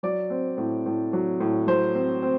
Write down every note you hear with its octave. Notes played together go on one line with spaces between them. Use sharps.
F#3 D5
C4
A2
A2
F#3
A2
F#3 C5
C4
C4